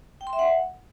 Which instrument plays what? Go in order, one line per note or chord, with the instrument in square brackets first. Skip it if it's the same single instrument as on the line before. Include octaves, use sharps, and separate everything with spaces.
[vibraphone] G5
C6
E5
F#5